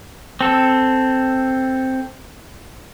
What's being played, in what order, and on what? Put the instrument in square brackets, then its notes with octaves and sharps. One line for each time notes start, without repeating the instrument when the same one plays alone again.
[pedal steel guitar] C4 A4